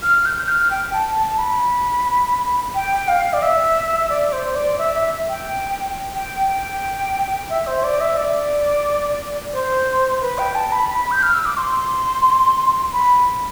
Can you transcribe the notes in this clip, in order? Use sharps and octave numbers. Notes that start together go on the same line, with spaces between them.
F6
G6
F6
G5
A5
A5
B5
G5
F5
D5
E5
D5
C5
D5
E5
E5
G5
G5
G5
E5
C5
D5
E5
D5
C5
B4
G5
A5
B5
B5
G6
F6
E6
D6
C6
B5